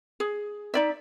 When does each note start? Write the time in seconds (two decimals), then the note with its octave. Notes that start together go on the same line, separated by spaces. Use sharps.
0.20 G#4
0.74 D#4 D5 E5